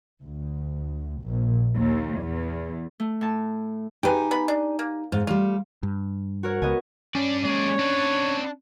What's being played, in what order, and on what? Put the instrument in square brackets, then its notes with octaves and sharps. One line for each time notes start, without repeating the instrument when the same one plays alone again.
[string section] D2
A#1
D#2
E2
[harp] A3
A2 A5
[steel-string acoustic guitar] D#4 G4 G#5 [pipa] B4 G5
[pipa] B3 B5
D4
A#3
[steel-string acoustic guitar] G#2 [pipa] F4
[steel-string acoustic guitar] G3 A3 [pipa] F4
[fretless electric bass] G2
[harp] F#4 A#4 C#5
[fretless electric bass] C#2 [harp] B3 D#5 G#5
[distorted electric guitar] G2 D4 [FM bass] C#4 [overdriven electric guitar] D5
[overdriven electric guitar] G#3 A#3 [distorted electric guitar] G#4 D5 [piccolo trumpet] C#5
[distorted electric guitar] C4 B4 [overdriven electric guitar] D4